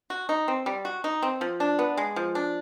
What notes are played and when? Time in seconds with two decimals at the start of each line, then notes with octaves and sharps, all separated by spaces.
0.10 F#4
0.29 D#4
0.48 C4
0.66 G3
0.85 F#4
1.04 D#4
1.22 C4
1.41 F3
1.60 D4
1.79 B3
1.98 G#3
2.16 F3
2.35 D4